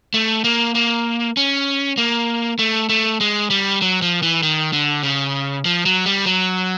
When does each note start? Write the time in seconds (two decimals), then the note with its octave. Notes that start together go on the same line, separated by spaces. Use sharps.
0.14 A3
0.44 A#3
0.75 A#3
1.37 C#4
1.98 A#3
2.59 A3
2.89 A3
3.21 G#3
3.50 G3
3.82 F#3
4.02 F3
4.22 E3
4.43 D#3
4.73 D3
5.03 C#3
5.65 F3
5.86 F#3
6.06 G3
6.26 F#3